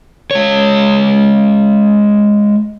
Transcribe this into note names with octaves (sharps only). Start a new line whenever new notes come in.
G#3 C#5